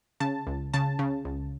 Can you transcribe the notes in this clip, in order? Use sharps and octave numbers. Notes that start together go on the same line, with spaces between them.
C#3 A5
C#2
C#3 A5
C#3
C#2